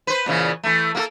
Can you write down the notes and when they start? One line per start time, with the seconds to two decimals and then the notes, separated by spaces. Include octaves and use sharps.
0.07 B4 C5
0.26 A#2 C#3 E3
0.63 E3 A3
0.95 A#3 F#4 A4